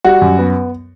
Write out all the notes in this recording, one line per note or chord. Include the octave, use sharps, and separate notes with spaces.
G3 F#4
F#2
B3